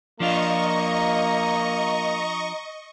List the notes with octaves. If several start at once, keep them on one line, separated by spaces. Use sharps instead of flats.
F3 A#3 D4 F4 D#5 A#5 C#6